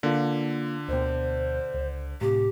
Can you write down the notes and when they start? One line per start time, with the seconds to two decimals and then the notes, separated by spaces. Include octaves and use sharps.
0.03 D3 A#3 F4
0.88 D2 B2 C5
1.74 C#2
2.21 A2 C3 G4